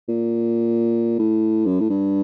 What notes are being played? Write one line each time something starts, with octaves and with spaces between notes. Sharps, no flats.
A#2
A2
F#2
A2
G2